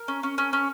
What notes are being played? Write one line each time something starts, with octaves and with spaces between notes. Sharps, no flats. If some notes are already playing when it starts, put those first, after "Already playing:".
Already playing: A#4
C#4
C#4
C#4
C#4